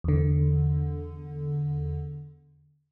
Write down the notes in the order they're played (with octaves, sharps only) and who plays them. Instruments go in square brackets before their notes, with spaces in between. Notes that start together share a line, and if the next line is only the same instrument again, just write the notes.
[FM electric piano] E2 D3